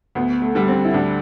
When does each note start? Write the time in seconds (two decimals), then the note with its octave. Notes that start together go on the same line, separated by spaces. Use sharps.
0.15 D2 B3
0.42 A3
0.55 D3 G3
0.68 C4
0.85 E4
0.94 D2 D4